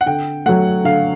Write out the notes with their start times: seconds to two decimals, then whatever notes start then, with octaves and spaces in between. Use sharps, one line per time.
0.01 F#5
0.06 D3 G5
0.46 F#3 A3 F#5
0.85 D3 F5